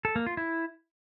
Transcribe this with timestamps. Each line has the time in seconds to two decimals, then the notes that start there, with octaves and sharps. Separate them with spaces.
0.05 A4
0.16 A#3
0.26 F4
0.37 E4